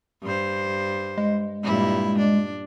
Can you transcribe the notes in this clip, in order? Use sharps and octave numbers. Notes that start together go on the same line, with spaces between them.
G2 C5
G#3
G2 A#2 E4
D4